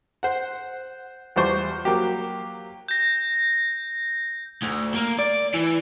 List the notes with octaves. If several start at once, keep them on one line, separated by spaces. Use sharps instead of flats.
C5 F#5
E2 F3 G3 C5 C#6
F#3 A#3 G4
G6 A#6
D2
A#3
D5
E3